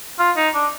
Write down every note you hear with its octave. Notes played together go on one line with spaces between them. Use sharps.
F4
D#4
D4